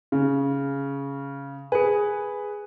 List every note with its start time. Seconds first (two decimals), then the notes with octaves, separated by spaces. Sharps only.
0.12 C#3
1.72 G#4 B4 G#5